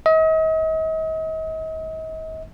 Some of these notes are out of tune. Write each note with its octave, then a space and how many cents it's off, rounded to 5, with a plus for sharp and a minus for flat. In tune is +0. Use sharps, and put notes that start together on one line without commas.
D#5 +40